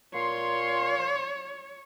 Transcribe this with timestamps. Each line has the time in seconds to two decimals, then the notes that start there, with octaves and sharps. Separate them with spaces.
0.14 A#2 C#5 F5 C6